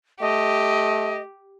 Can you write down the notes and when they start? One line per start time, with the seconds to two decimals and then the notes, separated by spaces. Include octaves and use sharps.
0.21 A3 G4 D#5